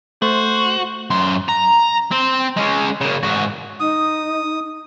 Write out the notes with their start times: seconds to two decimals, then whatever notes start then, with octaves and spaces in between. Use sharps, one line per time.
0.22 A3 F#4 C5
1.10 F#2 C6
1.48 A#5
2.11 C4
2.57 G#3 C#4
3.01 C#3 A#3
3.23 G#2 F#4
3.80 D#4 D#6